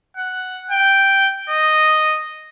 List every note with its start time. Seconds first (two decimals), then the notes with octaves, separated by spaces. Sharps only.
0.17 F#5
0.71 G5
1.49 D#5